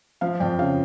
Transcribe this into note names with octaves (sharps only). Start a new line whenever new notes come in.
F3 F5
F2 G5
C#3 F5